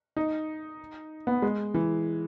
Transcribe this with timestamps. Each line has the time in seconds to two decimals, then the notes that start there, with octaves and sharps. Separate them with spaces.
0.17 D#4
1.27 B3
1.42 G#3
1.74 E3